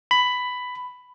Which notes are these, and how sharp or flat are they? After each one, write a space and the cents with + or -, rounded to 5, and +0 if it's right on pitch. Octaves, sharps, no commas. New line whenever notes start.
B5 +10